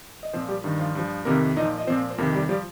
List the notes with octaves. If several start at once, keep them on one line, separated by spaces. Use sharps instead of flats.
D#5
A#2 F3 C4 C5
G3 G4
G2 D#3
F3 F4
G2 F3
F2 C3 D#3 A#3 A#4
A#2 F3 D#4 D#5
D#5
A#2 F3 C4 C5
C5
F2 C3 D#3 A#3 A#4
G3 G4
F3 G3 G4